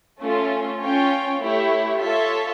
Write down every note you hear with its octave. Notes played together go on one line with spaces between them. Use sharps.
A3 C#4 F4 A4
C#4 F4 C#5 G5
A3 E4 G4 C#5 E5
F4 A4 C#5 E5 A5